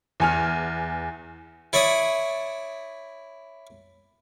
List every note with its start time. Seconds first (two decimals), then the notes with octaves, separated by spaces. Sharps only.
0.20 E2 G#5 F6
1.73 E4 C#5 D5 E5 D#6